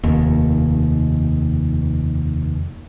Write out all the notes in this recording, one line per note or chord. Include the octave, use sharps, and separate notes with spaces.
F1 D#2